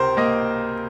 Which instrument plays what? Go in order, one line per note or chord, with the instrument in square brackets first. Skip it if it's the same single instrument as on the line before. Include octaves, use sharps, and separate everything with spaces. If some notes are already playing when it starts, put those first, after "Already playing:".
Already playing: [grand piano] C#2 C3 A#4 C5
A#3 D#5